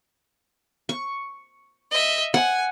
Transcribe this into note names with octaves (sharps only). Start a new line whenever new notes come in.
C#6
D#5 E5
F#5 G#5